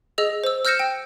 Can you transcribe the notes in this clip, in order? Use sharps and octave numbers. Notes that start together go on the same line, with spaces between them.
G#4 D#5 E6 F7
C5 E6
E6 F6 G6 A#6 C#7 E7
G5